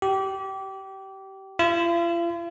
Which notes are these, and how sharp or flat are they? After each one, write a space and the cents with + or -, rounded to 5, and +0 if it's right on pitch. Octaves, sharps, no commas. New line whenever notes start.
G4 -25
F4 -45